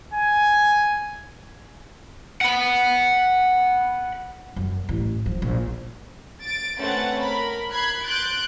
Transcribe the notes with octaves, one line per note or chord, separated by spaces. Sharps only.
G#5
F#5 B5
F#2
A1
F3
A#1
A6 D7
A3 C4 C#4 B4 F#5 A6
A#4 B5
B5 F#6 G#6 C7
C6 F#6 G6 A6 D7